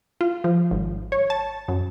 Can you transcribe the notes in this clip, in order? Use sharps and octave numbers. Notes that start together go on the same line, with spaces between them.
F4
F3
G#1
C#5
A5
F#2